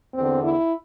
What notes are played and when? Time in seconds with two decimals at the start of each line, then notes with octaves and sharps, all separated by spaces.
0.14 E2 D3 C4
0.43 E4